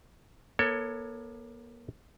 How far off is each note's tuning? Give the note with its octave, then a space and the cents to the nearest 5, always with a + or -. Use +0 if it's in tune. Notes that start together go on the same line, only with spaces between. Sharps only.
A#3 +40 A4 +25 C#5 +0